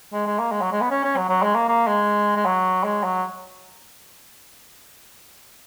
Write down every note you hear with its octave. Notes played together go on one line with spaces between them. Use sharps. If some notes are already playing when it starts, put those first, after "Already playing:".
G#3
G#3
A#3
G#3
F#3
G#3
B3
C#4
C#4
F#3
F#3
G#3
A#3
A#3
G#3
G#3
F#3
G#3
F#3